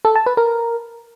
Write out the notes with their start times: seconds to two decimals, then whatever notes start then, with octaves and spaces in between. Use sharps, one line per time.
0.05 A4
0.16 A5
0.26 B4
0.37 A#4